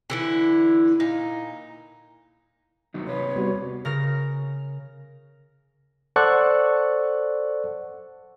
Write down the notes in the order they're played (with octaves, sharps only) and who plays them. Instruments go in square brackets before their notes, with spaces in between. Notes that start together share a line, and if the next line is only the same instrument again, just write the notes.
[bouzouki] D3 E3 E4
A#2 D#4
[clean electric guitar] D#2 F#3 D#4
[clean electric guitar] C3 B4 [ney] C#5
[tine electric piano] G3 B3 F#4
[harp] C#3 A#4 F6 A#6
[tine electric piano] A4 C5 D5 F#5 C#6 F#6